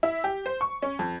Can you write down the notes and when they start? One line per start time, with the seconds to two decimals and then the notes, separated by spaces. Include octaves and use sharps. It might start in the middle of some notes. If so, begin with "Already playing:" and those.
0.03 E4
0.24 G4
0.46 C5
0.61 C#6
0.82 C#4
0.99 F2